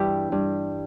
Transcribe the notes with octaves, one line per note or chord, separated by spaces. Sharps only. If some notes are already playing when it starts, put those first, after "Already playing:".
Already playing: G2 E3 D4 E4 G4
G2